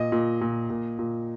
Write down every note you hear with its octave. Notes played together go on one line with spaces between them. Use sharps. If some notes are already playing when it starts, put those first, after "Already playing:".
Already playing: A#2 D#5
A#2
A#2
A#2
A#2